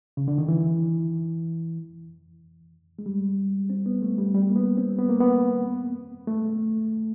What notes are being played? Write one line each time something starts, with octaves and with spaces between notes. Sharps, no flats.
C#3
D3
D#3
E3
G#3
G3
C4
B3
A3
G3
G3
A#3
B3
C4
B3
A#3
B3
A3